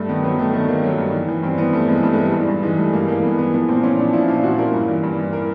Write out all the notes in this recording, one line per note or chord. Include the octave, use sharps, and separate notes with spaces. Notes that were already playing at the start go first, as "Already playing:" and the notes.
Already playing: G2 A3
D#3 B3
F#3 B3
D#3 A3
D#3 A3
D#3 A#3
F#3
G2
E3
E3
G2 C4
E3 B3
G2 A3
E3 G#3
G2 A3
G#3
E3
G3
G2
G2
E3 G#3
G2 A3
G2 A#3
E3 A#3
G2 B3
E3 B3
F3 B3
A#2 C4
A#2 C#4
F3 D4
F3 E4
A#2 F4
F3 F#4
A#2 A#4
G2
E3
G2
E3
A#4